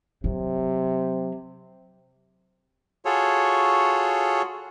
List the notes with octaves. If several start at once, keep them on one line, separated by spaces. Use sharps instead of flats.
C3 F#3
F4 F#4 G#4 A4 C#5